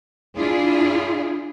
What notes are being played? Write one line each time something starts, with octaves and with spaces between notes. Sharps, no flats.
D4 E4 F4 G#4